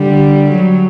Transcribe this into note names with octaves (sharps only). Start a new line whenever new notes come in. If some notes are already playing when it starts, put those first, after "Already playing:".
Already playing: D3 G3
F#3